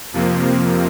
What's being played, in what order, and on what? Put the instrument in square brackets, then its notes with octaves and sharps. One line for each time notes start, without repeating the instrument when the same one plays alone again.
[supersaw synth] F2 C3 F3 A#3